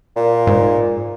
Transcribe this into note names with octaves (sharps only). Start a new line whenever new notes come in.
A#2
G#2